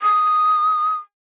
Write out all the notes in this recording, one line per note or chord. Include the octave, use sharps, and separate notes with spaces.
D#6